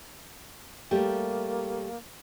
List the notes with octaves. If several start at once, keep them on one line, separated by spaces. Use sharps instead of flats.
G3 A3 A#3 G4